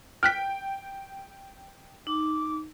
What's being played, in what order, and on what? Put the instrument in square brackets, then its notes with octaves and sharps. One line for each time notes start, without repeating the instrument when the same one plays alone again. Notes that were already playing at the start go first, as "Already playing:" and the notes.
[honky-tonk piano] G5 [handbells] F6 F#6 B6
[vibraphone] D#4 [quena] D6